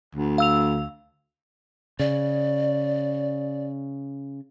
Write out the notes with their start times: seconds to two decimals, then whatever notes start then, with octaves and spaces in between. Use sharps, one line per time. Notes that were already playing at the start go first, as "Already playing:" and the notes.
0.15 D2
0.38 F5 E6 F7
2.00 C#3 D5